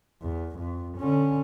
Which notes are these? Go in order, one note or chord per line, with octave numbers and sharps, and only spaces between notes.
E2
F2
D3 C#4